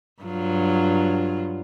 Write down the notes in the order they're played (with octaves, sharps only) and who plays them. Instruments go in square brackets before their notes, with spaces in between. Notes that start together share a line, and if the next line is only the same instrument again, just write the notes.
[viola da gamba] G2 F#3 F4